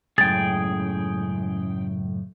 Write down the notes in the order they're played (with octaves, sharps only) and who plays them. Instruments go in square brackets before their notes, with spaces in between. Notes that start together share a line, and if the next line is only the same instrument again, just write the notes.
[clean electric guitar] C#2 F#2 A2 [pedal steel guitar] G#4 G5 [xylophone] A6